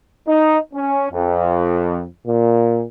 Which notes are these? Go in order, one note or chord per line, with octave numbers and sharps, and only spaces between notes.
D#4
C#4
F2
A#2